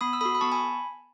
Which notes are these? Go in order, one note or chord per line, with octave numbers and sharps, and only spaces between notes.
B3 B5 D#6
E6
F#4 A4 B5 D#6
B5
B3 A5 C#6
G#5 B5